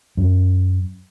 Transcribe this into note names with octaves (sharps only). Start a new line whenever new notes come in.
F#2